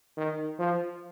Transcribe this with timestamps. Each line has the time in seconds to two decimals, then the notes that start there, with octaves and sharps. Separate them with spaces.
0.17 D#3
0.59 F3